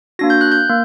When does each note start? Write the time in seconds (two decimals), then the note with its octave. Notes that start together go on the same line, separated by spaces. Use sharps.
0.19 A#3 D4 F#4 A#6
0.30 G6
0.41 F#6
0.52 G6
0.69 A#3